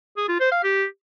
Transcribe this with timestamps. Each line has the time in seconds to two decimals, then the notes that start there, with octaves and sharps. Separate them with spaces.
0.17 G#4
0.28 F4
0.40 C5
0.52 F5
0.63 G4